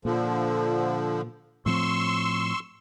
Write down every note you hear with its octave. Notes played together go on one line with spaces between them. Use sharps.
A#2 D3 F3
A2 F3 C4 C6 C#6 E6